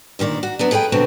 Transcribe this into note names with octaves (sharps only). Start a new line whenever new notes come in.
D2 A#2 D#3 D5
F#4
F#3 B3 D4
G#4 A4 B4 C#5 G5
D2 B2 F#3 C4 D4